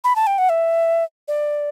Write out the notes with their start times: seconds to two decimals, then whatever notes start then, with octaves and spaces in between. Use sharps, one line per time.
0.04 B5
0.16 A5
0.27 G5
0.38 F#5
0.49 E5
1.28 D5